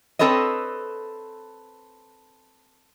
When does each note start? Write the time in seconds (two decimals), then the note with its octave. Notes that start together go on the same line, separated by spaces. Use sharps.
0.19 C4 A4 B4 C#5 D#5